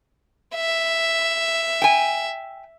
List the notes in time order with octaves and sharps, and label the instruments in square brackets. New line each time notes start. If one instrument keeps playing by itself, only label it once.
[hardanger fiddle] E5
[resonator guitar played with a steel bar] G5 G#5